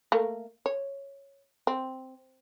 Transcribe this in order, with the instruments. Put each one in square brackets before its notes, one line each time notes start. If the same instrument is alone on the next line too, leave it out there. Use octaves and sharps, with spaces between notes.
[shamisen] A3 A#3
C#5
C4